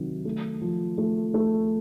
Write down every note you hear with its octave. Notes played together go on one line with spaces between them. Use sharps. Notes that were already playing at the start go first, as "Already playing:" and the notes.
Already playing: C3 D#3 F#3
A3
F3
A3
A3